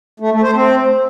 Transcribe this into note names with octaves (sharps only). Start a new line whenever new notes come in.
A3
A3
C5
C4